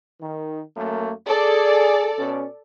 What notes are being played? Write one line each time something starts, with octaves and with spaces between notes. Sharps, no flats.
D#3
F#2 A3 A#3
G#4 A4 D5
B2 C#4